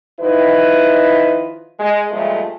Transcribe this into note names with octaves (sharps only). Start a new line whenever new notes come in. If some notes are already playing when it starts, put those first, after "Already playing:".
D#3 F3 D#4 E4 B4
G#3
G2 A#2 F3 G#3 A3